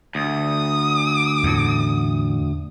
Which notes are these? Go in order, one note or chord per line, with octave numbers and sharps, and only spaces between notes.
D2 D#6
E2 A2